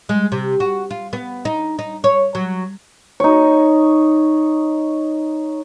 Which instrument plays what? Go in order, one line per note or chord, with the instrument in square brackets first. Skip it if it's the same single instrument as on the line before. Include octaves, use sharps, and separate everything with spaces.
[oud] G#3
C3
F#4
F4
B3
D#4
D#4
C#5
F#3
[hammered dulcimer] D#4 C#5